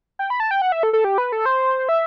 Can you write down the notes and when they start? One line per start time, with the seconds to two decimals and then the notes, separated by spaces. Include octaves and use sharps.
0.19 G5
0.30 B5
0.40 A5
0.51 G5
0.62 F#5
0.72 E5
0.83 A4
0.93 A4
1.04 G4
1.18 B4
1.32 A4
1.46 C5
1.89 E5